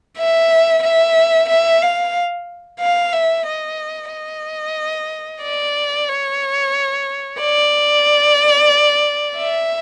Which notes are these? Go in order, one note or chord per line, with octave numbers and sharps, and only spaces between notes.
E5
E5
E5
F5
F5
E5
D#5
D#5
D5
C#5
D5
E5